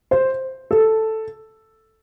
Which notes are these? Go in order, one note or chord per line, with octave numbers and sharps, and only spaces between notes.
C5
A4